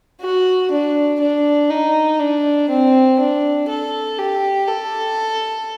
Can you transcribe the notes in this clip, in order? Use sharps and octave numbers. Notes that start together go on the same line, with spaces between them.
F#4
D4
D4
D#4
D4
C4
D4
A4
G4
A4